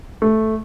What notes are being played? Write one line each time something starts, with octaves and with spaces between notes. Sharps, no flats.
A3